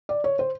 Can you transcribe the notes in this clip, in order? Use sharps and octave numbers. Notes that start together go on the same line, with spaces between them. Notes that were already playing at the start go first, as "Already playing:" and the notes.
D5
C#5
C5